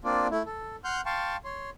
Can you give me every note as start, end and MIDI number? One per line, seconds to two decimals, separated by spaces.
0.04 0.27 58
0.04 0.27 60
0.04 0.27 62
0.04 0.27 65
0.04 0.27 74
0.31 0.43 57
0.31 0.43 64
0.46 0.76 69
0.84 1.01 78
0.84 1.01 84
0.84 1.01 89
0.84 1.01 91
1.06 1.37 77
1.06 1.37 79
1.06 1.37 81
1.06 1.37 84
1.06 1.37 85
1.44 1.70 73
1.44 1.70 84